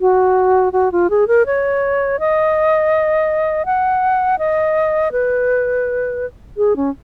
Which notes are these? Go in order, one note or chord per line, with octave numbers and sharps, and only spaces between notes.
F#4
F#4
F4
G#4
A#4
C#5
D#5
F#5
D#5
B4
G#4
C#4